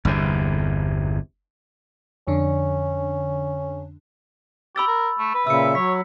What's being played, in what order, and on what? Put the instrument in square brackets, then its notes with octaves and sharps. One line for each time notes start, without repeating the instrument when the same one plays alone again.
[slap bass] G1 E2 C3
[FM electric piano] F2 D3 D4 [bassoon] C#4
[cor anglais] G4 [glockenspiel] B5 E6 A6
[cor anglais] A#4
A3
B4
[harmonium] A#2 C#3 E5 [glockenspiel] E6 C#7
[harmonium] F#3 [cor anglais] C#5 [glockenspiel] B6